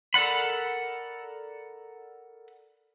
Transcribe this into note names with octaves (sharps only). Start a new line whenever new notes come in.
A4 A#4 D5 F#5 B5